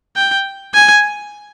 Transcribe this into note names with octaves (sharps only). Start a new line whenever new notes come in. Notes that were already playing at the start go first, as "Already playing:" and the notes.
G5
G#5